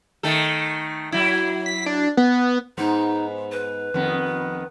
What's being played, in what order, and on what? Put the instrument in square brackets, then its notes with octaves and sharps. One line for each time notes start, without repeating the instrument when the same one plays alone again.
[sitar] D#3 A3 A4
F#3 E4
[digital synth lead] B6
D4
B3
[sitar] G#2 B3 [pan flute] D#4
[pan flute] B4
[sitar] F2 D#3 B3